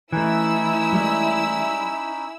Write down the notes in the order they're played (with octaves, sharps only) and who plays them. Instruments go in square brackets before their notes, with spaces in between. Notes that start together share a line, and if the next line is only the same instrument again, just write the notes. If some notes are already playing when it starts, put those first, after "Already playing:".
[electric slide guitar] E3 A3 [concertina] C#4 D#4 B5 [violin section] E4 E6
[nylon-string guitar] G3 G#3